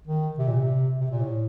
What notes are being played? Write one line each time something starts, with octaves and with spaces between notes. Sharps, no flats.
D#3
C3
A#2
C3
C3
A#2
A2